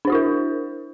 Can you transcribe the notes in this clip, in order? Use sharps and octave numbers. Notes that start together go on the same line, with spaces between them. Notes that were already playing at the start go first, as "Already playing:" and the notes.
D4 E4 F#4 A#4 C5